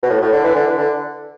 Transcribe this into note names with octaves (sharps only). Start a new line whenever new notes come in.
B2
A2
A2
D3
E3
D3
E3
D3